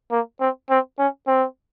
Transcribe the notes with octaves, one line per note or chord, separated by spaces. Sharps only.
A#3
C4
C4
C#4
C4